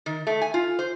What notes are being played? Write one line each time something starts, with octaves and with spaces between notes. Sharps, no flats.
D#3
A3
G#5
F4
C5